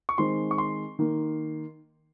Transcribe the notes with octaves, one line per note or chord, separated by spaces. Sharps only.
C#6
D#3 G#3 C4 C6
C#6
C6
D#3 A#3